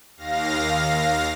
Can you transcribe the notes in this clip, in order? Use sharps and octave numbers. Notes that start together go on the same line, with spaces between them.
D#2 F5 A#6